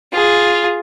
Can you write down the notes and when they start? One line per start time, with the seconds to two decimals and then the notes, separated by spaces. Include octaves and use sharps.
0.12 F4 G#4